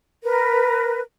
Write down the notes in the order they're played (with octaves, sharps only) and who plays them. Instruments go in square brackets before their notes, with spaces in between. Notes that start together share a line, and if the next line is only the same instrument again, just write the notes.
[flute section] A#4 B4